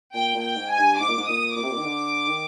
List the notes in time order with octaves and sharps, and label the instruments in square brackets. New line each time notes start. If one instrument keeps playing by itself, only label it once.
[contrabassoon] A#2 [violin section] G5
[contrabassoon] A#2
[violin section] G5
[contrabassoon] G#2
[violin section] G#5
[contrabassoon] G2
[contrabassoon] G#2 [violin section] D6
[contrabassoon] A#2
G#2
[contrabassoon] A#2 [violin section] D#6
[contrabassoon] A#2 [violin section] D6
[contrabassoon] C3
A#2
D#3
D3
D#3